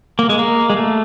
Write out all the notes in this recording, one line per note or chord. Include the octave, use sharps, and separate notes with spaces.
A#3
G#3
A#3
G#3
A3